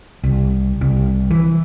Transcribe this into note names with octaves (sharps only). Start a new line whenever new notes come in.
C2
C2
E3